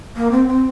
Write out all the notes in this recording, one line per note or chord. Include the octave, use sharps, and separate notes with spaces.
A#3
C4
C4